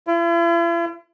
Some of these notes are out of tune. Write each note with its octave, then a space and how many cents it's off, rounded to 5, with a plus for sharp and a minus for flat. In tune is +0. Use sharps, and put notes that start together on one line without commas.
E4 +45